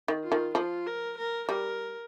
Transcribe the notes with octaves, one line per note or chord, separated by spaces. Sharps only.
D#3
F4
D#3
F3 F4
A#4
A#4
G3 A#4